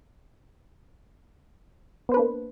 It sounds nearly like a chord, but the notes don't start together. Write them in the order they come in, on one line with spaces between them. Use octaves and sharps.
B3 C5 B4 D4 A#3